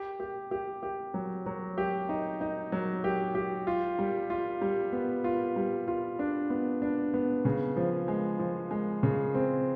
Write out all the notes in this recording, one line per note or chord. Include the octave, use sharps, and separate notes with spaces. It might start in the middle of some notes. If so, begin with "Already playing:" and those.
Already playing: G4
G4
G4
G4
F#3
F#3
G4
D#4
D#4
F#3
G4
G4
F4
G3
F4
G3
B3
F4
G3
F4
D4
B3
D4
B3
C#3
F3
G#3
F3
G#3
C#3
C4